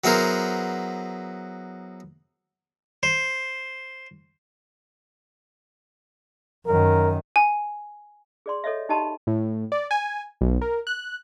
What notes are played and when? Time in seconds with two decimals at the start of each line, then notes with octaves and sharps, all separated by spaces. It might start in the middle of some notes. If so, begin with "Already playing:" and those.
0.04 F#3 B3 E4 G#4 A#4 C5
3.03 C5
6.67 F#2 D#3 A#4
7.36 G#5
8.46 G#4 D5 C6
8.64 A4 C#5 D#5 E5
8.89 D#4 G4 D#5 A5 B5 C6
9.27 A2
9.72 D5
9.91 G#5
10.41 B1
10.61 A#4
10.87 F#6